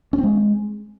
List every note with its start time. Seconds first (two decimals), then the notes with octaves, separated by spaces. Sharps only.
0.13 C#4
0.18 C4
0.24 G#3